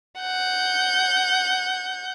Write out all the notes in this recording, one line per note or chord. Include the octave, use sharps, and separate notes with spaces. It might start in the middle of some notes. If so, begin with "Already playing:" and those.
F#5 G6